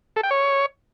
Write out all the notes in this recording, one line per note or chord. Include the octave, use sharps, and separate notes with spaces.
A4
G5
C#5